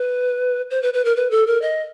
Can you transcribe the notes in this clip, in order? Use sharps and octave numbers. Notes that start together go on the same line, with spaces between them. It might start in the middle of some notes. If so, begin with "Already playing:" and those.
Already playing: B4
C5
B4
B4
A#4
B4
A4
A#4
D#5